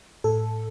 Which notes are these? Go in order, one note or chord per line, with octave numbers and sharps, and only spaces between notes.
A2 A4